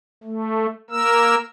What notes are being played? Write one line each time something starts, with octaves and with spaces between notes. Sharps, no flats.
A3
A#3 A#4 E6